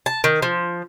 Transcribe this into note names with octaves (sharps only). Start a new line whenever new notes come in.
A5
D#3
F3